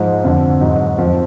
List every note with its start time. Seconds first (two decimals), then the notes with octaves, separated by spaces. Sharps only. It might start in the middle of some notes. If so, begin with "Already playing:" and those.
Already playing: G#2 F3 D#4
0.24 F2 D3 F3
0.61 G#2 F#3 D#4
0.98 F2 F3